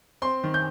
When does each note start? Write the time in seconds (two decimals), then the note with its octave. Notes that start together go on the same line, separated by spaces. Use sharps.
0.22 C4 C6
0.44 D#3
0.54 G6